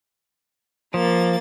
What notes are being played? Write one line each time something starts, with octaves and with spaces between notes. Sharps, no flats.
F3 A#3 A6